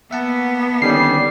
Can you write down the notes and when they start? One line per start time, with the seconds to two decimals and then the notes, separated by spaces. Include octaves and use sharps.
0.11 A#3 B3 E5 F#5 A5
0.82 D3 D#3 G3 C#4 C7